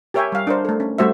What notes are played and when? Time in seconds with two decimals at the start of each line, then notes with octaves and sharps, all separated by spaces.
0.14 G4 A#4 C#5 E5 G5 G#5
0.32 G3 F5
0.47 D4 A#4 C5
0.65 A3 A4
0.80 C#4
0.98 G3 A3 F#4 C5 E5